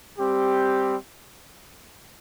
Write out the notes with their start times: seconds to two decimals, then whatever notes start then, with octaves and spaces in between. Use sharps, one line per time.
0.18 G3 C4 G4